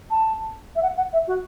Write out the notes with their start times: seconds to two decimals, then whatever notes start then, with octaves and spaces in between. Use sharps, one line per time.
0.11 A5
0.76 E5
0.83 F#5
0.97 F#5
1.13 E5
1.27 F#4